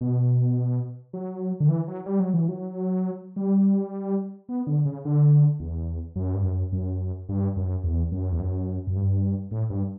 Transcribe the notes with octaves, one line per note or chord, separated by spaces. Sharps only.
B2
F#3
D3
E3
F#3
G3
F#3
E3
F#3
G3
B3
D3
C#3
D3
E2
F#2
G2
F#2
F#2
G2
F#2
E2
F#2
E2
F#2
F#2
G2
A2
G2